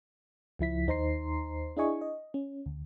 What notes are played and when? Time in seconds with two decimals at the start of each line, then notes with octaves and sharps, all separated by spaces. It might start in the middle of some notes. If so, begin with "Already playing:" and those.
0.59 C#2 F3 E4 B6
0.87 D#2 D#4 C5 A#5 C6 C7
1.77 D4 E4 G#4 D#5 G#5 C#6
2.01 D#5
2.34 C#4
2.66 D2